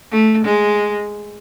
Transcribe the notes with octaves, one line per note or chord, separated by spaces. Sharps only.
A3
G#3